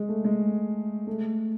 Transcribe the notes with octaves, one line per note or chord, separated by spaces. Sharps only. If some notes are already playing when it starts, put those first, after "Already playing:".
Already playing: G#3
A3
G#3
A3